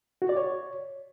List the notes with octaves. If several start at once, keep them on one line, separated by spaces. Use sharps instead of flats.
F#4
D5
C#5